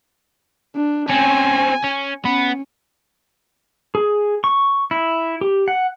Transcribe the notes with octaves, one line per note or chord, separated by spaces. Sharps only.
D4
C4 C#4 G#5
C#4
B3 C#4
G#4
C#6
E4
G4
F#5